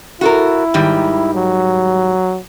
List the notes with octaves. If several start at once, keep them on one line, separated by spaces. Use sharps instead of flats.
E4 F#4 A4 A#4
G#2 D#3 G3
F#3